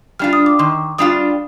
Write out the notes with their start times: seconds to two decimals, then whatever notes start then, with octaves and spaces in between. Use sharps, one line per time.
0.19 G3 D4 F4 F6
0.33 D#6
0.46 D6
0.59 D#3 C6
0.98 G3 D4 F4 D#6